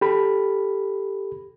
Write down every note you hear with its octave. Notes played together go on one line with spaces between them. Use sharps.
G4 A4 B5